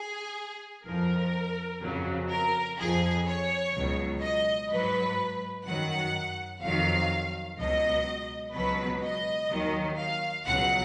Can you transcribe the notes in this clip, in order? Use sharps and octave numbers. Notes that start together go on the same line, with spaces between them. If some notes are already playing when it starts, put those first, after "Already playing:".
Already playing: G#4
F2 F3 A#4
F2 C#3 F#3
A#4
F2 F3 G#4
C#5
C#2 B2 F#3
D#5
G#2 F#3 B4
F#2 D#3 F#3 F#5
F2 D#3 F#3 F5
C#2 B2 F#3 D#5
C#2 B2 F#3 B4
D#5
D#2 D#3 F#3
F5
C#2 B2 F#3 F#5